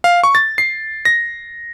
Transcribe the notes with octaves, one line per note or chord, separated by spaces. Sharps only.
F5
C#6
A6
C7
A#6